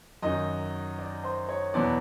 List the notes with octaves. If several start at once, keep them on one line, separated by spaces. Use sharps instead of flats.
F#2 D#3 F#3 D#5
D5
C5
C#5
E2 B2 F#3 D5